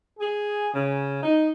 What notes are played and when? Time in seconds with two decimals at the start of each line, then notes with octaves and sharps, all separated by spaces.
0.19 G#4
0.73 C#3
1.23 D#4